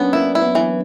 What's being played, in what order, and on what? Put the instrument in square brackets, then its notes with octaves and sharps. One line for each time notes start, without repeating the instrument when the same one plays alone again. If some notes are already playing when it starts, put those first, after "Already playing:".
Already playing: [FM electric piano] F#3 A#3 C#4 D4 [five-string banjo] B3
[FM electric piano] A#3 [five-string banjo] E4
[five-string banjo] E4
[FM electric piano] B3
[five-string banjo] E3